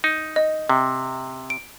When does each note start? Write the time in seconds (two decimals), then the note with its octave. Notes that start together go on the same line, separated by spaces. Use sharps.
0.04 D#4
0.36 D#5
0.69 C3
1.50 D7